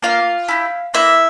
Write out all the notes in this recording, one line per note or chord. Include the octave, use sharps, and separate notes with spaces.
A#3 F4 F5
E4 G4
A#3 E4 E5